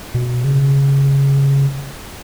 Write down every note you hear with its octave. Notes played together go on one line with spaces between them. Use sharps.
B2
C#3